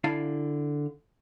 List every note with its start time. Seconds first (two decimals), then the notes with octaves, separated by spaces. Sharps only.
0.04 D3 E4 F5 G#5 A5